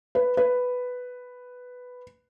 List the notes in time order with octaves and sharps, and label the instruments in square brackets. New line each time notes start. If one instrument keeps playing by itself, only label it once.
[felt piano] B4
B4